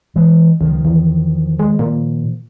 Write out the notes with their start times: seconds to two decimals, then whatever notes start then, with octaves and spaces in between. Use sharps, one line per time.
0.16 E3 G#3
0.61 C#2 D#3 F3
0.85 E2
1.59 G#3
1.79 A#2